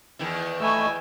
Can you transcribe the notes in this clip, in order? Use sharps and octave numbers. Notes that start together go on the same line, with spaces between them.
E2 D#3 E4
A3 D#5 G#5 B5 C#6 E6